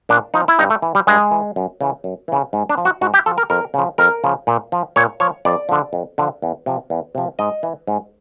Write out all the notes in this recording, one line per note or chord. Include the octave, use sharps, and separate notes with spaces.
A#2 D4
F3 D#4
E4
G2 D#4
A3
E3
G3
G2 G#3
E3
F#2
C#3 E3
F#2
C#3 E3
G#2
D4
F3
F#4
G#2 F#4
G4
F3 A4
A#4
F2 A#4
C#3 F3
F2 A#4
C#3 F3
A#2
F3
A#2 C#5
F3 C#5
F2 D5
D3 F3
F2
D3 F3
E2
C3 F3
E2
C3 F3
G#2 D#5
E3
G#2